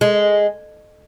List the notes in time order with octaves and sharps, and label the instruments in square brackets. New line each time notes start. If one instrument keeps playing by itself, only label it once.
[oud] G#3